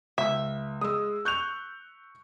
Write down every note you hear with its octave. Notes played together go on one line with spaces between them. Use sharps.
C#2 E5
G#3 D#6 E6
C#6 F#6 G6 F7